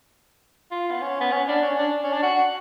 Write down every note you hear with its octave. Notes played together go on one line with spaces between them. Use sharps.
F4
B3
C#4
B3
C#4
D4
C#4
D4
C#4
D4
F#4